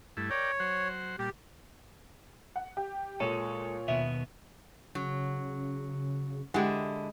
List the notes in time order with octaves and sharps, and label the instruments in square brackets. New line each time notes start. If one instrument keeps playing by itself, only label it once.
[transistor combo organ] G2 A3 E4
[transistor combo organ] A#4 D5 G5 [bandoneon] C#5
[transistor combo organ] F#3 C5 F#5
[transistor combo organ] A#2 G3 [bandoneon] G4
[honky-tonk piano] F#5
G4
[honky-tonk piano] A#2 C#5 D#7 [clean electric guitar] G#3 A4
[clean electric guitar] D#2 B2 B3 [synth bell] E5
[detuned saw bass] C#3 [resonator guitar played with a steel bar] F#3
[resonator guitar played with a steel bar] D3 E4 [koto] G#3 [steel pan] G4 F#5